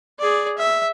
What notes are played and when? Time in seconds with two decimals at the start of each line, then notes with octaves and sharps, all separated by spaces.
0.19 G#4 D5
0.58 E5